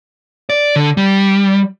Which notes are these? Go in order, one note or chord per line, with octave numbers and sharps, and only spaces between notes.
D5
D3
G3